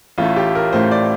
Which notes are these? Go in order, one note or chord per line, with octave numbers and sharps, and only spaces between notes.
A1 A2 A3 F4
G4
A#4
A1 A2 A3 C5
D5